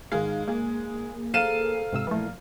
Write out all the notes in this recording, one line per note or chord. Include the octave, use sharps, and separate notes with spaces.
G#2 D#3 G#3 F5
A#3 G#4
A4 C5 F5 A#5 D#7 E7
G#2 C3 E6
A#2 E3 F3 G#3 A3